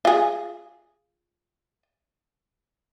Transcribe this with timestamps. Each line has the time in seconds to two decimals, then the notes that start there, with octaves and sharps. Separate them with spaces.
0.05 F4 G#4